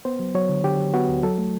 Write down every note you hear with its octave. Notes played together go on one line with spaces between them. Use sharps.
B3 C5
F#3
F#3 C#5
D3
D3 G4
F#3
B3 F#4
D2
F#3 A4
A3